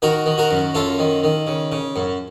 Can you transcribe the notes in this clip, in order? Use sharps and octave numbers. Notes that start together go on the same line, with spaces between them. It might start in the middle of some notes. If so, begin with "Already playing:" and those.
D#3 F#4 A#4
D#3
F#4 A#4
F#2
F#2 F4 A4
D#3
D#3
C#3
C#3
F#2